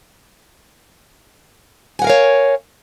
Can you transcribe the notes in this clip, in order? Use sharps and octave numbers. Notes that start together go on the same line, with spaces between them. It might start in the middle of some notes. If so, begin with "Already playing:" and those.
A#4 C#5 F5 F#5 G#5